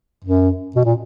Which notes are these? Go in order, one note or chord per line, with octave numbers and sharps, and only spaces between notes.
F#2
B2
A#2